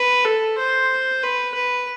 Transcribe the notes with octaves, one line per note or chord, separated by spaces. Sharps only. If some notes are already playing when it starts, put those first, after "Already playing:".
Already playing: B4
A4
C5
B4
B4